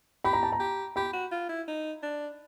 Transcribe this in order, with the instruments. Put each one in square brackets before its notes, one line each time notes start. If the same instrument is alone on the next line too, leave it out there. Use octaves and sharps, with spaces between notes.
[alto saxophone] G4 [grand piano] B5
[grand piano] A#5
A5
A#5
[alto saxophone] G4
[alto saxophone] G4 [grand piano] B5
[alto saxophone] F#4
F4
E4
D#4
D4